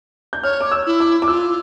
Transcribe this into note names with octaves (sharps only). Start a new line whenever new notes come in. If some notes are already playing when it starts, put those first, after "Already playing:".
G6
C#5 F6
D6
E6
E4
D6
D6
F4 E6